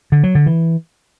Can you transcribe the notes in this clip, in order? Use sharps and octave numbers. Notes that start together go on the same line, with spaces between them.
D3
F#3
D3
E3